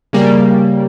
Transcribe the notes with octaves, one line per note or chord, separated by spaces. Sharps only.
C#3 G3 A#3